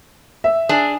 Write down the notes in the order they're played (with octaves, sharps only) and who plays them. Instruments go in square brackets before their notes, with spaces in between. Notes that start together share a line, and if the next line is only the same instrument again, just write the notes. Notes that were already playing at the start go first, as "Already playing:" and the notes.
[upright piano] E5
[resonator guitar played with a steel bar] D4 G#4